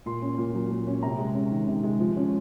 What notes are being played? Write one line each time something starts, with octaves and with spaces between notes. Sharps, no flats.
A#2 C6
C#4
A#2
F#3
A#2
C#4
C3 A#5
G#3
C#4
D#3
C3
G#3
F3
C#4